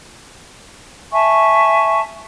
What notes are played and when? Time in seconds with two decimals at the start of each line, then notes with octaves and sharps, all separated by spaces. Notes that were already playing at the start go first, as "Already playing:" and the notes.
1.12 E5 G#5 A5 C#6